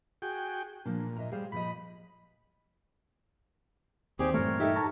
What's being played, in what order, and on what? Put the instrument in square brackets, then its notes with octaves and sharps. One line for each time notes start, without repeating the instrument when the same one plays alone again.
[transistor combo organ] F#4 G#4 G5
[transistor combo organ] A#2 [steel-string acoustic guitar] F3 A#3 D4
[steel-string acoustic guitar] D#5 E5 A#5
[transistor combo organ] G3 [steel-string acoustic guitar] G#4 C5 F5
[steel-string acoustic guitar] A#2 F3 D#5 [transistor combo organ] B5
[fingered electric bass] D#2 D#3 [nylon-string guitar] C4 D5 E5 [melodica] G4 G#4
[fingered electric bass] G2 A#2 E3 [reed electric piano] A3 [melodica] A#4 C#5
[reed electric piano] D#4 E5 [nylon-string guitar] G4 A4
[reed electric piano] A5 A#5 C#6